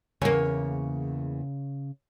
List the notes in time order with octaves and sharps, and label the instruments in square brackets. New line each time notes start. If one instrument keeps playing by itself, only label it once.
[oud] E2 A#3 [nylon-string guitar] C#3 C#5 G#5